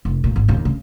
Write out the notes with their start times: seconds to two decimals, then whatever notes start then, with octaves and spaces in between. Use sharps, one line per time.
0.05 F1
0.24 A#2
0.36 G#1
0.48 D#2 C#3
0.65 C#3